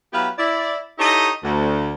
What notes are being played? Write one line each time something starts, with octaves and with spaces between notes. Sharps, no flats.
F#3 B3 E4 G4 B4 F5
E4 D5
D#4 E4 G4 A4 C#5 D#5
D2